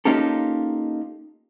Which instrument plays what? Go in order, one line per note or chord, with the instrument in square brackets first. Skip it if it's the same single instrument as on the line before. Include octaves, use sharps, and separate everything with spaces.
[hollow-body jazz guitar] A#3 C#4 D#4 F4 G4 A4